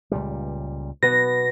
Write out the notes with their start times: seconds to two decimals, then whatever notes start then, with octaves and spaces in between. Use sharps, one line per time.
0.11 C#2 A#2 G3
1.03 B2 B3 A#6